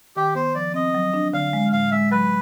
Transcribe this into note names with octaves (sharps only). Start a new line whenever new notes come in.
D#3 G4
B3 C5
F3 D5
C4 D#5
F#3
D4
D3 F5
G#3
A2 F5
G#3 E5
F#3 B4